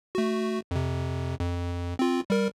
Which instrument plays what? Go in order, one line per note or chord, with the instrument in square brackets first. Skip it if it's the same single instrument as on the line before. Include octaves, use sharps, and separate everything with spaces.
[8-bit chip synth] A3 F#4
F2 C3
F2
C4 F4
G3 A#4